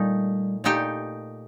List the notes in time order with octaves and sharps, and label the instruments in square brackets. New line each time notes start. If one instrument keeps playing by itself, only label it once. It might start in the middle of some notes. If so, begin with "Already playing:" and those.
Already playing: [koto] A#2 A3 D#4 [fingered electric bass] G3
[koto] A#2 A3 D#4 G4